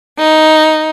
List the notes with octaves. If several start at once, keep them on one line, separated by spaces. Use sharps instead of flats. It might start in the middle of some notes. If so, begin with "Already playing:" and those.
D#4